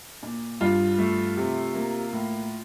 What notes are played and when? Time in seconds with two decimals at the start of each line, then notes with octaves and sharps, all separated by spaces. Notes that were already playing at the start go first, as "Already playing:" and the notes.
0.23 A#2
0.61 G2 F4
0.98 A3
1.37 C3
1.75 A#3
2.13 A2